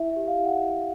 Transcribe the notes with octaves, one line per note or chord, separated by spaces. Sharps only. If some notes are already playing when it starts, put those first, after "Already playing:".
Already playing: E4 E5
E5
G4
F5
E4
F#5
E4